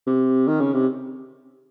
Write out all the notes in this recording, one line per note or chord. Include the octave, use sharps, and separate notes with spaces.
C3
D#3
C#3
C3